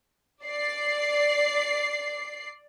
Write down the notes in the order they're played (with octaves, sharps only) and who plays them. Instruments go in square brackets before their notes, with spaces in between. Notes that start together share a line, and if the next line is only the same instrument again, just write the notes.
[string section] D5 C7